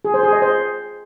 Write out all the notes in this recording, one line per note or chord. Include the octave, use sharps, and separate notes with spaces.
G#4
C5
G#4
D#5
C5